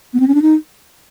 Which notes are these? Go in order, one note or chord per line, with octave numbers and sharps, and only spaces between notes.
B3
C4
C#4
D4
D#4